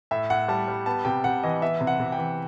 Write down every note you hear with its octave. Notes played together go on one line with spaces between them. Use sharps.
A2 E5
A2 F#5
G3 A5
G3
B3 A5
C3 G5
C3 F#5
E3 D#5
B3 E5
C3
F#5
C3
G5
E3